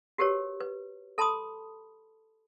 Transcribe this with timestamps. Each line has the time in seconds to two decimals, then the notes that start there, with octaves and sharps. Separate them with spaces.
0.18 F#4 G4 A#4 B4 C#5
0.60 B4
1.18 A4 A5 B5 C6 D#6